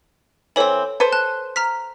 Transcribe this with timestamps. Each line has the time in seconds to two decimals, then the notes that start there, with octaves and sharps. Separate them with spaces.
0.56 E3 C4 A4 C#5 F#7
1.00 A4 B4 C5
1.13 A5 F#6
1.56 A#5 F6 B6